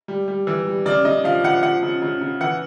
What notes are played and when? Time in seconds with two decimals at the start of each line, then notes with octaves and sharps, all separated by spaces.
0.08 G3
0.28 G3
0.47 E3
0.67 G3
0.86 C#3 D5
1.05 C#3 D#5
1.24 F3 F5
1.44 F3 F#5
1.63 F3 F#5
1.83 C#3
2.02 C#3
2.21 C#3
2.41 E3 F#5